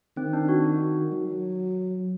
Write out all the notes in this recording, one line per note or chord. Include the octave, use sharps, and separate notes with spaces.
D#3 C4
D4
F#4
F#4
F#3